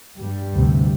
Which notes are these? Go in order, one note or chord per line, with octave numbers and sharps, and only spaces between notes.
G2 G3
D2 C3